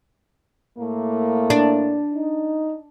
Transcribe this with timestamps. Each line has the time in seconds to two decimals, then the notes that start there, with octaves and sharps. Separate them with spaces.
0.78 A2 A3 A#3
1.50 D4
2.14 D#4